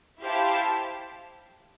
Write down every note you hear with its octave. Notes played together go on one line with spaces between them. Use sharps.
E4 G4 C5 F5 A5